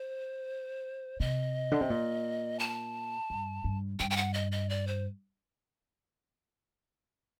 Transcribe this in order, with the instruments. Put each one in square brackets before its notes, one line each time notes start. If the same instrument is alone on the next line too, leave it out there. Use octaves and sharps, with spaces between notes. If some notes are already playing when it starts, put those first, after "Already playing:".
Already playing: [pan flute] C5
[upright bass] C3 [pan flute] D#5
[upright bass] D3
C3
A#2
[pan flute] A5
[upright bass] G2
G2
[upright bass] G2 [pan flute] G5
[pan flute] G5
F#5
D#5
D#5
D5
C5